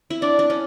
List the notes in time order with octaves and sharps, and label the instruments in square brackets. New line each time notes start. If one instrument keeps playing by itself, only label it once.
[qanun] E4
[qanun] D4 [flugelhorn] D5
[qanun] D4
C#4